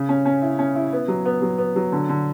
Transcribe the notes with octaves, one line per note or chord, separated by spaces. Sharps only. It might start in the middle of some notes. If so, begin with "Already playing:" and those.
Already playing: C#3
C#4
C#4
E4
C#4
E4
B3
F#3
B3
F#3
B3
F#3
D3
D3